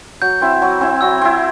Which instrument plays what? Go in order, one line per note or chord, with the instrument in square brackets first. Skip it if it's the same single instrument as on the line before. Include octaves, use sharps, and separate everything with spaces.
[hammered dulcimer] F#3 [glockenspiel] G6
[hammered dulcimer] C4 E4
F#3
C4 E4
[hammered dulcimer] F#3 [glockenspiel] E6
[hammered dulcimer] C4 E4